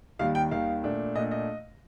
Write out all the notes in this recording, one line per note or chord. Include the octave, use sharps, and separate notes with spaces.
D#2 D#3 G3 F5
G5
D#2 D#3 G3 F5
A#2 A3 D4
A#2 A3 D4 D#5
D#5